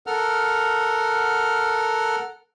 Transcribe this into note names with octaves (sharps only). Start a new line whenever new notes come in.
A4 A#4 F#5 F6